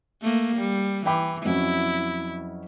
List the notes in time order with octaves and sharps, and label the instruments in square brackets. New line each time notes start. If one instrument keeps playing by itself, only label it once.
[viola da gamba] A3 A#3
G3
[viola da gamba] E3 [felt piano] G5 B5 D6
[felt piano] F2 F#3 C#4 [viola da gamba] E4